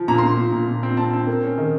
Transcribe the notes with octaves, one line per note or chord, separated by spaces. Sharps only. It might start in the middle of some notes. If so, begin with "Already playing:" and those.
Already playing: F3
A#2 A#5
A#2 C6
A#2
A#2
A#2
C4
C4 A5
C4
A#3
C#4
D#3